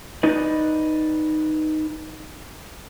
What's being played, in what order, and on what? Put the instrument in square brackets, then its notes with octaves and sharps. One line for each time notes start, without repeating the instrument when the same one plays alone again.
[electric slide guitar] D#4 B4 D5 D#5